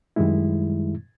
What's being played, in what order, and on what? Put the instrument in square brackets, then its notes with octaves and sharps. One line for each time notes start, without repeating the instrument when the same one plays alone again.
[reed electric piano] F#2 D#3 G3 G#3 E4